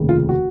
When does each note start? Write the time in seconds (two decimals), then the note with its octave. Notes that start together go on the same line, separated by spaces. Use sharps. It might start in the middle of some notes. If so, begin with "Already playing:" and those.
Already playing: F1 D#2 C#3
0.09 F4
0.29 F#4